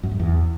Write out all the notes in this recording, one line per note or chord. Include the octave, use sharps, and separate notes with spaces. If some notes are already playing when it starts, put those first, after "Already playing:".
F#2
G2
E2